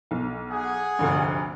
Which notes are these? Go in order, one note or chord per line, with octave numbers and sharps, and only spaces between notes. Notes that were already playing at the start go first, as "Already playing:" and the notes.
B1
G#4 F#5
F1 D2 G2